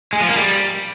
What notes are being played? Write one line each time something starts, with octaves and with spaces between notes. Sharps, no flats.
G#3
F3
A#3
G3